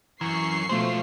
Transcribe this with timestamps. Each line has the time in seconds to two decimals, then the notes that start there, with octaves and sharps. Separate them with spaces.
0.21 F#2 E3 C#6 C7
0.69 B2 F3 G#3 A3 C5 F5